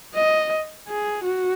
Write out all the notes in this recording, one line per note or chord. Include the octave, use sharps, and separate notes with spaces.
D#5
G#4
F#4